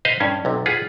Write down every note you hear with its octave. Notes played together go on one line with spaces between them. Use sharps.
B4 C5 D#5 F5
G2 C#4
B1 C3
F4 G#4 B4 F#5